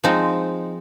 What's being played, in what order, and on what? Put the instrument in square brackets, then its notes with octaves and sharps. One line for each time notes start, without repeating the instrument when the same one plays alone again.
[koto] F3 G#3 C4 D#4